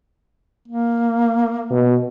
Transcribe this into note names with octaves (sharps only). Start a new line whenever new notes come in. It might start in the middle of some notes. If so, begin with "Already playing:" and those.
A#3
B2